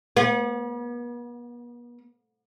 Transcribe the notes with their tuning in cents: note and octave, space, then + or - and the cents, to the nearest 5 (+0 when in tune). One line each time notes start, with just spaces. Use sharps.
B3 -45